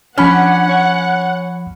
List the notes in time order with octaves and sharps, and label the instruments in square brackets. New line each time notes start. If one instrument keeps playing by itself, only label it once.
[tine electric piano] F3 B5 F6 [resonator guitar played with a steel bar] C#4 [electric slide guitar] D4 [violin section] F#5
[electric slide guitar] C#5 G#5